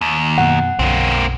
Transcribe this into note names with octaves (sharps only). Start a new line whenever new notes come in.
D#2
F#2 B2 F#5
B1 F#2 D3 A#3 C4